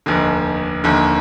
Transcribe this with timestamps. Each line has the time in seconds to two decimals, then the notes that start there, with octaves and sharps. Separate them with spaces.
0.06 F1 D#2 D3
0.84 F1 D#2 D3